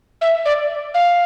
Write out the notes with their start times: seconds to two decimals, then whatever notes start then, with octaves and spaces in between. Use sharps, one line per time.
0.21 E5
0.45 D5
0.94 F5